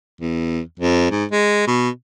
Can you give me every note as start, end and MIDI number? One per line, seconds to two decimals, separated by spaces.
0.21 0.60 40
0.79 1.10 41
1.11 1.25 44
1.32 1.65 56
1.67 1.89 47